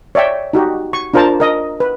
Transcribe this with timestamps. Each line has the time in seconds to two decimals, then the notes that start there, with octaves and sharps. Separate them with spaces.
0.15 C#5 D5 E5 G5
0.53 D#4 F#4 G4
0.93 C#6
1.14 D4 F4 A#4 C5 A5 A#5
1.40 A#4 D#5
1.80 B4